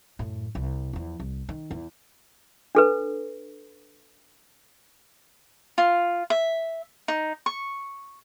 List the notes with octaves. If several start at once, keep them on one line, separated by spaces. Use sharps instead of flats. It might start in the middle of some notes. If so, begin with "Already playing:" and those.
F#2 A2
C2
E2 F3
C2
D#3
E2
D4 A4 B4
F4
E5
D#4
C#6